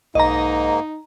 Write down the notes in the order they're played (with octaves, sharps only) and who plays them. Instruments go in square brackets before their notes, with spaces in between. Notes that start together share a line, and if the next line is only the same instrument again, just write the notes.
[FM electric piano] B1 [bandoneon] G#2 A#3 [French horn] D#4 [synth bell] D#5 A#5